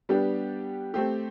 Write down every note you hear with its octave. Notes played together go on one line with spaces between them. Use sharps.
G3 B3 D4 G4
A3 C4 G4